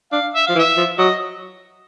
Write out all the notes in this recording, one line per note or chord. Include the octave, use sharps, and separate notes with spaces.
D4 F5
E5
F3 F5
E3
E5
F3
F#3 D#5